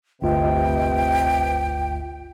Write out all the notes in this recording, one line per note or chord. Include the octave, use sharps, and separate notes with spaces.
G1 D2 C3 F4 B4 D#5 G5